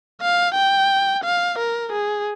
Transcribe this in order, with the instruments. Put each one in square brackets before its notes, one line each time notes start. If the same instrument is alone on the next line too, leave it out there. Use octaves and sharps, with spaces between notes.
[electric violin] F5
G5
F5
A#4
G#4